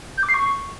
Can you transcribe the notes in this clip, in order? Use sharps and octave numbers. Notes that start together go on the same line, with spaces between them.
G6
D6
C7
C#6